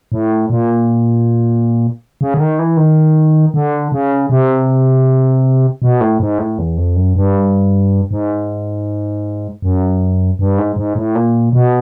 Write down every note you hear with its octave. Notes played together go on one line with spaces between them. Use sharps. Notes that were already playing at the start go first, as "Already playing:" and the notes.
A2
A#2
C#3
D3
D#3
E3
D#3
D3
C#3
C3
B2
A2
G#2
A2
E2
F2
F#2
G2
G#2
F#2
G2
G#2
G#2
A2
A#2
B2